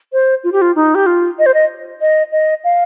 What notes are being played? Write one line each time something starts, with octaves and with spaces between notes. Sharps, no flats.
C5
F4
G4
F4
D#4
G4
F4
D#5
C5
D#5
D#5
D#5
F5